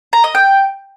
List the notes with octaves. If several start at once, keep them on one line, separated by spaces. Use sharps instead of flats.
A#5
D#5
G5